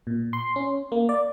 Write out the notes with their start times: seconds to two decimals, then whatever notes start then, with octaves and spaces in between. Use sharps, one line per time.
0.07 A#2
0.33 C6
0.56 C#4
0.92 A#3
1.09 D5